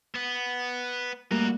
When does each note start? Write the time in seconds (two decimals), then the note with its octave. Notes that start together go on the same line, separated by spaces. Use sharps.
0.15 B3
1.31 G3 A3 A#3 F#4 A#4